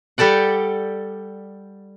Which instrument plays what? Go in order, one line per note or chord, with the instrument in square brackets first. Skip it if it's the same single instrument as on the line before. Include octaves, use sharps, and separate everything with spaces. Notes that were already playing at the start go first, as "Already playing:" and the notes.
[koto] G3 G4 A4 D5 F#5